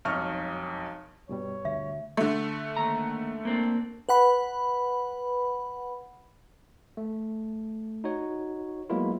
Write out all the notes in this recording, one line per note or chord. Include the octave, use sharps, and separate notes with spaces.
E1 B1 F2 D#4 C#6 F6
G2 B2 G3 C#5
D2 E5
D3 A3
D#2 A#5
A#3 C4 D4
B4 F#5 B5
A3
D#4 F#4 C#5
F#3 G#3 A#3 B3 E4 F4